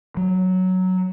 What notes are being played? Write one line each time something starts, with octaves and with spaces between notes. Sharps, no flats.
F#3